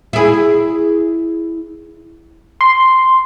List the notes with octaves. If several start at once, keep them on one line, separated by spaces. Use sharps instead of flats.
E4 G#4
C6